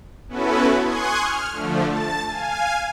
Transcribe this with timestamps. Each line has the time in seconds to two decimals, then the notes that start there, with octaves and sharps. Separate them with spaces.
0.29 B3 C#4 E4 F#4 A4 B4
0.81 G#5 C6 C#6 D#6 F#6 G#6
1.19 F6
1.52 D3 F3 A3
1.85 A5 A6
2.26 F5 G#5